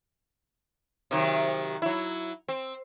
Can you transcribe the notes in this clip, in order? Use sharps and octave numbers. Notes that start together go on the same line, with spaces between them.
C3 D#3 F#3
F#3 E4
C4